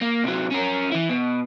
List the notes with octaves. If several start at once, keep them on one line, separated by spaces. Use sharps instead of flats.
A#3
C3 F#3
C#4 A#4
E3 E4
B2